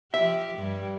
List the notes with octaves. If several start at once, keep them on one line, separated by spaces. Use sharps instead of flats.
F3 G4 E5
G2 G3